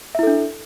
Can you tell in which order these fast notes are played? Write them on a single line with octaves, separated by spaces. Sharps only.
E5 E4 A4 D4